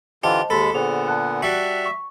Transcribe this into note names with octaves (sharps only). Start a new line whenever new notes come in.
D3 E3 F4 G4 C5 D#5 A5
D#2 G#3 A4 B5
A#2 D3 B3 G#4 C5 F7
A5 F#6
G3 F#4 E5
C#6